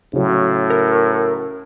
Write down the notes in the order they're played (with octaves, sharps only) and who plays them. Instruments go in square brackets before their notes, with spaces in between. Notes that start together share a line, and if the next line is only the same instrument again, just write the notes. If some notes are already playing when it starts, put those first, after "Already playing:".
[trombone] A2 [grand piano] C#3 F#3
[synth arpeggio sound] A#4